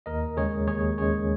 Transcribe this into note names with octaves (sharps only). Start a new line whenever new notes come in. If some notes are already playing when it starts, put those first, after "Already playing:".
D#2 A#4 D#5
C#3 G#3 G#4 C#5
D#2 G#4 C#5
C#3 G#3 G#4 C#5